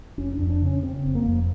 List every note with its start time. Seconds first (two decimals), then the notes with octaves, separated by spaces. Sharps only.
0.17 F1 C#4
0.34 D4
0.39 F2
0.50 D4
0.61 C#3 C#4
0.83 C#3 C4
1.05 F1
1.15 A#3
1.25 F2